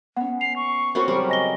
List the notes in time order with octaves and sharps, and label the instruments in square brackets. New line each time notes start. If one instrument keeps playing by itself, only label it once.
[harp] B3 C#4 [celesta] F#5
[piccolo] C7 [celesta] F7
[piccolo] C#6
[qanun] C4 C#4 F#4 [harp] A4 B5 [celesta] A#4
[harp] C#3 F#3 [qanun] G3 A#4 [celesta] C5 [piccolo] C#6
[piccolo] D#5 [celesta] G#5 A#6 G7